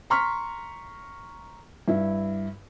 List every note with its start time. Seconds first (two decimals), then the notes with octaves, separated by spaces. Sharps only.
0.10 A#5 C6 C#6 F6 B6
1.88 G2 E4